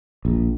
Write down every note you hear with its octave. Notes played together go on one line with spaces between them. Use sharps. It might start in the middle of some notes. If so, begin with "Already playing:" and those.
A#1